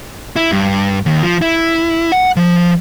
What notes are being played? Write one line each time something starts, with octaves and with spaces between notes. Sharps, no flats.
E4
G2
D#2
F3
E4
F#5
F3